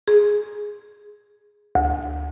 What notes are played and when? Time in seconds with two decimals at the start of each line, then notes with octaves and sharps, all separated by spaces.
0.08 G#4
1.75 D2